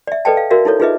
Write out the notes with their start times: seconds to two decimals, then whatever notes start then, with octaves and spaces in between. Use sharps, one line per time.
0.07 D5 E5
0.25 A4 B4 D5 D#5 G5 A5
0.37 F5
0.50 F#4 A#4 D5 E5 F5
0.65 D#4 E4 A4 C#5
0.80 D#4 F4 G#4 B4 D#5 E5